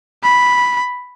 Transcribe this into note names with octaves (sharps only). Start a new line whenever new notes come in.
B5